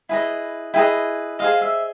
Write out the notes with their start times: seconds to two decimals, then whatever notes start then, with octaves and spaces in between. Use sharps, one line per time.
0.09 E4 G#4 B4 D#5
0.74 E4 G#4 B4 D#5 G5
1.39 G#4 C5 D#5 F5
1.61 E5